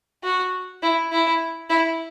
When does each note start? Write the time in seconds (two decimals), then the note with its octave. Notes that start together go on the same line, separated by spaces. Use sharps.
0.23 F#4
0.82 E4
1.12 E4
1.69 E4